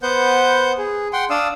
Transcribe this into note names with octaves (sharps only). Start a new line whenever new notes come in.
B3 B4 C5 F#5 G6
G#4
F#5 G5 C6
D4 D5 F5 D#6 E6